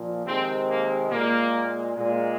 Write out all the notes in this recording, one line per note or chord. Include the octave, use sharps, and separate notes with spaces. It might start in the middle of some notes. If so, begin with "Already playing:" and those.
Already playing: A#2 F3
C3 D#3 G#3 C4
A#3
A#2 G#3 A#3
A#2 G#3